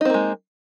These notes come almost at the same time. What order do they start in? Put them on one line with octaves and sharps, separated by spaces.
D#4 C4 A#3 G#3